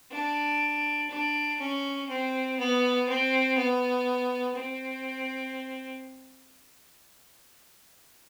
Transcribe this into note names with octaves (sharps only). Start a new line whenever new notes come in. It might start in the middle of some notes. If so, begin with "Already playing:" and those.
D4
D4
C#4
C4
B3
C4
B3
C4